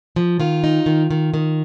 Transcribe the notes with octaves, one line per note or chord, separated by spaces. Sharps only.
F3
D#3 F4
D#4
D#3
D#3
D#3